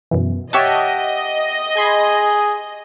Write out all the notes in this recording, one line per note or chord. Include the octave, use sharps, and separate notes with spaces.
F#2 B2 E3
G4 C#5 D#5 E5 F#5 A5
G#4 B5 C6 G#6